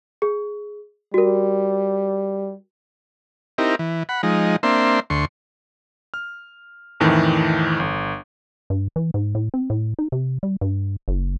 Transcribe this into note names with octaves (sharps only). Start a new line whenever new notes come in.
G#4
G3 F#4 A#4
C4 D#4 E4 G4 A#4
E3
F#5 B5
F3 G#3 D#4
A#3 C4 D4 E5 C6
D2 C6 C#6
F6
F2 A2 D#3 E3
G1
G2
E3
G#2
A2
C4
A2
D#4
C3
G3
G2
F#1